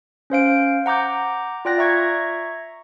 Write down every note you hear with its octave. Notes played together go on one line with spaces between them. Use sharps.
C#4 C5 F5 D7
F#5 A#5 D6 G6
F4 D5 G5 F#6 A#6
E5 A#5 C#6 G#6 A#6